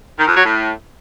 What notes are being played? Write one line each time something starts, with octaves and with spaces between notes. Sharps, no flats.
D#3
F2
F#3
A2